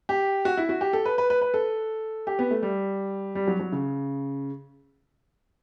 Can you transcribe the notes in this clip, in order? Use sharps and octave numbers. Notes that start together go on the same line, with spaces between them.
G4
F#4
E4
F#4
G4
A4
B4
B4
B4
B4
A4
G4
B3
A3
G3
G3
F#3
F#3
C#3